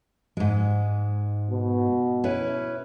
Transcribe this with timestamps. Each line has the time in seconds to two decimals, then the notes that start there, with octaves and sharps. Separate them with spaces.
0.37 G#2 G#3
1.51 B2
2.24 C#4 E4 B4